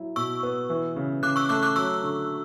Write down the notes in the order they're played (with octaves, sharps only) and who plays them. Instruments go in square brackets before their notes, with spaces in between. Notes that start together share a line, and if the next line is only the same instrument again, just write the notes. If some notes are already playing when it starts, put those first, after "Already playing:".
Already playing: [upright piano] F#3 E4
[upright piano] B2 [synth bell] C#6 E6
[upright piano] B3
E3
C#3
[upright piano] C#3 [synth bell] D6 F#6
[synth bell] C#6 E6
[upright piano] A3 [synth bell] D6 F#6
[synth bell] D6 F#6
[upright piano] F#3 [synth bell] C#6 E6
[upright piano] D3